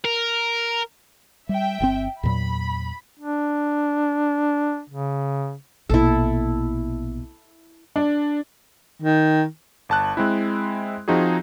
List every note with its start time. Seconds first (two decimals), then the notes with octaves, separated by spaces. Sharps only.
0.04 A#4
1.49 G3 E5 G5
1.80 G1 C#3 C4
2.23 E2 A#2 F#3 B5
3.20 D4
4.90 C#3
5.89 A#1 B2 E4 A4
7.96 D4
9.02 D#3
9.89 G1 A5 F#6
10.17 G#3 C4 E4
11.08 F3 C4 D#4 F#4 G#4